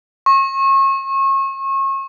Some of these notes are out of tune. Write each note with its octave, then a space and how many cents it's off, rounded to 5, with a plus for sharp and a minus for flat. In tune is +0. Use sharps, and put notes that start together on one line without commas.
C#6 -35